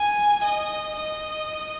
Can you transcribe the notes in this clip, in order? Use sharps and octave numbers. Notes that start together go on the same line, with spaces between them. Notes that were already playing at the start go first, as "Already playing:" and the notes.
Already playing: G#5
D#5
D#5